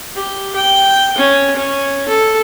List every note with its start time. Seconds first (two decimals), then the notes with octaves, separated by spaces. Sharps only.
0.15 G4
0.56 G5
1.18 C#4
1.56 C#4
2.08 A4